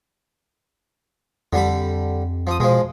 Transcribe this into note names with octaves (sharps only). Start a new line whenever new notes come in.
F2 D3 G3 B5
F3 D#6
B2 F3 G#3